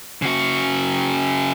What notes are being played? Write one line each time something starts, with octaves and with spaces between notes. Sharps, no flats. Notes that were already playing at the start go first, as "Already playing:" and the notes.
C#3 F#4